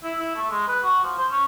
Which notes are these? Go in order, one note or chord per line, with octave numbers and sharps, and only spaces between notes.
E4
E4
A3
G#3
B4
F#4
F3
C5
C#4